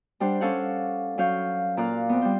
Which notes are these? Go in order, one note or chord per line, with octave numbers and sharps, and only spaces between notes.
G3 D4 G4 C5 F#5
C#4 D4 A4 C#5 F5 F#5
F#3 C#4 C#5 F5 G6
A#2 A#4 D5 F5 D6 F#6
B3 C4
G3 C5